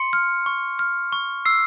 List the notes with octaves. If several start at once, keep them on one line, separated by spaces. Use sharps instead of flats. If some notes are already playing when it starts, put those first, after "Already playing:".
Already playing: C6 C#7
F6
C#6
F6
C#6
E6 C7